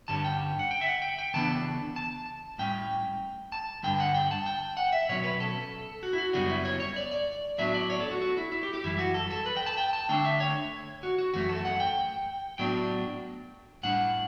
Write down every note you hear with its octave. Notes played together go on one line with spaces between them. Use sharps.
G2 D3 G3 C#4 A5
G5
F#5
G5
E5
F#5
G5
G5
C#3 E3 B3 D4 A5
A5
A2 G3 C#4 G5
A5
G2 D3 G3 G5
F#5
G5
A5
G5
F#5
E5
B2 F#3 C#4 C#5
B4
A4
F#4
E4
F#4
F#2 C#3 G3 B3 D4 F#4
E4
C#5
C#5
D5
D5
A2 F#3 B3 D4 E5
D5
C#5
A4
F#4
F#4
E4
E4
G4
G4
F#2 E3 G3 E4
F#4
A4
A4
B4
G5
A5
G5
A5
D3 A3 D4 G5
E5
C#5
F#4
F#4
F#2 E3 A3 C#4 F#4
A4
F#5
G5
A2 F#3 B3 D4 G5
A2 G3 D4 F#5